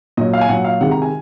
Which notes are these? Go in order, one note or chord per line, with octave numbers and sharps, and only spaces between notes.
A#2 F#3 D#5
F5
G#5
A#2 F#3 F#5
F5
C3 D#3 G#3 F#5
A#5
G#5